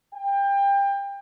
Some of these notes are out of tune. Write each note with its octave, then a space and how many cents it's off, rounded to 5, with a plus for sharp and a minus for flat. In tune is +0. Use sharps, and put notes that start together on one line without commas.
G5 +25